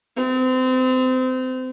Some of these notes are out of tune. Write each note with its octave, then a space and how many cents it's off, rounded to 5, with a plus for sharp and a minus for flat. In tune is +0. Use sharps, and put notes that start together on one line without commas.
C4 -30